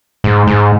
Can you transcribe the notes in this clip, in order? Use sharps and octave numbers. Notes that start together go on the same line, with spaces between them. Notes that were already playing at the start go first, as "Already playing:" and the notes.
G#2
G#2